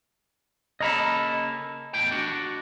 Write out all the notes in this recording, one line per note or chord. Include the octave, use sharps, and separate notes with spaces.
C#3 A#3 A4 D#5 A#5 B5
E2 A2 G5
D4 F#4